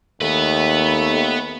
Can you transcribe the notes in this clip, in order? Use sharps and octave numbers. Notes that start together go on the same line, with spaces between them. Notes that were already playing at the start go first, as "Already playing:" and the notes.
D#2 A3 B3 B4